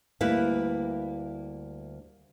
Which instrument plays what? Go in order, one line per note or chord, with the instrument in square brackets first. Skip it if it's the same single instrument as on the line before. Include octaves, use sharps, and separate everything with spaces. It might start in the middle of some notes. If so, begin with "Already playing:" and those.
[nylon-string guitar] D2 G3 A#3 E4 B4